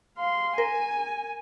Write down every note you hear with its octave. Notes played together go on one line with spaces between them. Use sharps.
F5 C6
A#4 G#5